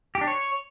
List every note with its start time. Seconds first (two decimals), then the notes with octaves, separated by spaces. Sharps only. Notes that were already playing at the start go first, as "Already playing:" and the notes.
0.15 G4
0.21 D4
0.27 C#5